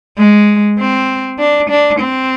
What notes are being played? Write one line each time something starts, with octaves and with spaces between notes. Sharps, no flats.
G#3
C4
D4
D4
C4